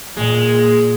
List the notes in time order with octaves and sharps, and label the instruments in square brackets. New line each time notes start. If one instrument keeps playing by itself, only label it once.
[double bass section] A#2 [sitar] G#3